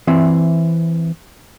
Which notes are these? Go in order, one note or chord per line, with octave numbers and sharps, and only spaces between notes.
E3 C4 E5